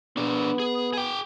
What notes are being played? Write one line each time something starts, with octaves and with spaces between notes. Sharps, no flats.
B3 D4 G#4
G#4
G#4 G5